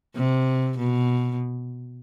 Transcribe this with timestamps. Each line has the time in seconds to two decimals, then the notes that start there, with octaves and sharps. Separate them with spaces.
0.15 C3
0.78 B2